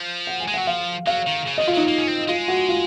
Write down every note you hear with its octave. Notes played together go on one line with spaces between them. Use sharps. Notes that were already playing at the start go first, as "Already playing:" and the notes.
Already playing: F3
F#5
G#5
G#3
F#5
F#3
F3 F5
F#3 F5
D#3
C#3
D#5
D#3
F4
F#3 D#4
A#3
C#4
C4
G#3 F4
F#4
F4